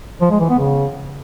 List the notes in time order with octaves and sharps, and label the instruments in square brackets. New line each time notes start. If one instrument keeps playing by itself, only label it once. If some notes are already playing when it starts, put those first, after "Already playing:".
[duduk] F3
G#3
E3
B3
C#3